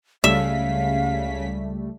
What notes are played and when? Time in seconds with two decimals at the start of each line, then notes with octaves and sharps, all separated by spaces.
0.24 C#2 C#3 G3 A3 E5 F5 B6